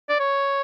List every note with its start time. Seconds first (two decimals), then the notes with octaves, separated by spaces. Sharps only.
0.09 D5
0.20 C#5